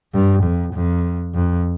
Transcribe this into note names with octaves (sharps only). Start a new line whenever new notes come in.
G2
F2
F2
F2